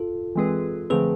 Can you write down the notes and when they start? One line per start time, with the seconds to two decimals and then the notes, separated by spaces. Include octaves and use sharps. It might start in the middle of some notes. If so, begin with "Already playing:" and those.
Already playing: F4 A4
0.35 E3 G#3 C4 G#4 B4
0.90 D3 F3 A3 C4 G#4 B4